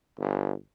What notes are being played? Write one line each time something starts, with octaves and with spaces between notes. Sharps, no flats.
G1